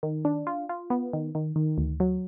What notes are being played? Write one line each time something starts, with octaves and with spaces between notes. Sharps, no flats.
D#3
D4
F4
F4
B3
D#3
D#3
D#3
D2
F#3